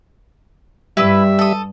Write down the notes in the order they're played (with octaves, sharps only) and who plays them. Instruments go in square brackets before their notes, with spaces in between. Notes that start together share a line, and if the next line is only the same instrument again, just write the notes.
[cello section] G2 [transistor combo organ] G3 E5 [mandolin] E4 B4 E6
[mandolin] A4 D#6